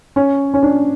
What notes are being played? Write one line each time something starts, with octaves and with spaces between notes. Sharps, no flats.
C#4
C#4
D4